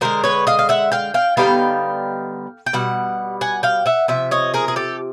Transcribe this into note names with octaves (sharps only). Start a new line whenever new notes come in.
D3 F3 G#3 A#4 C5
B4 C#5
D#5 F5
F5
E5 F#5
F5 G5
F5 G5
D3 G3 B3 D#4 F5 G5
G5
B2 G3 F#5
F#5 G#5
F5 G5
E5 F#5
C3 F3 E5
C#5 D#5
G#4 A#4
G#4
G4 A4